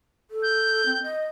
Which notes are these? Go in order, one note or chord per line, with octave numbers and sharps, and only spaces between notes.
A4
G6
C4
D#5